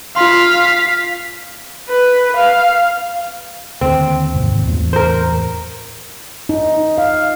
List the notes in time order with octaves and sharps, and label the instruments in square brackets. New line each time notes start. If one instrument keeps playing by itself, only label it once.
[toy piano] F4 C6 [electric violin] F5 B6
[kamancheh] B4
F5
[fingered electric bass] D#2 D3 [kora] C4
[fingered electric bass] D#2 G#2 C3
E2 A2 E3
[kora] A#4 C5
[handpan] D#4
F5